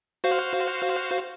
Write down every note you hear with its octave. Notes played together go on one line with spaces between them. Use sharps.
F#4 C5 F5